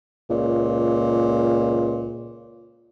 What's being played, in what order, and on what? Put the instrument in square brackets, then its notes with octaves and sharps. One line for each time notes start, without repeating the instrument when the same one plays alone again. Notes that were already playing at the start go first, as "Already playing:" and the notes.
[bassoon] C#2 [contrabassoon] A#2